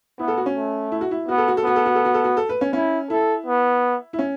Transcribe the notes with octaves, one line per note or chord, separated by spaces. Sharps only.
B3 E4
A4
F#4
C#4
A3
E4
F#4
E4
B3 F#4
A4
F#4
A4
B3 F#4
A4
F#4
A4
F#4
A4
F#4
A4
B4
C#4
C#4 E4
E4 A4
B3
E4
C#4